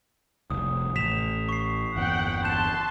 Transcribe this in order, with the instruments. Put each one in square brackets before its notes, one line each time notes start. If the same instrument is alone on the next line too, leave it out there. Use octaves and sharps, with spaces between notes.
[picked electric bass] F1 C2 [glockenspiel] D#6
[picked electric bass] A1 [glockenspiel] B6 E7 F7
[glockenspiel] C#6 C7
[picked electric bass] G1 E2 [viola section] F#5 G5
[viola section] A5 C6 [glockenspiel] F#6 G6 E7